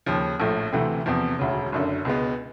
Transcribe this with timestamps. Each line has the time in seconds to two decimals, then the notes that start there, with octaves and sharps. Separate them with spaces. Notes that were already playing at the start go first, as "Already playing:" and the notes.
0.06 D#2 C#3 F3
0.40 A#1 A2 F3 A3
0.72 D2 C3 E3 A3 C4
1.06 E2 C3 F3
1.39 E1 D2 C#3
1.72 F#1 F#2 D3
2.05 C#2 B2 G#3 B3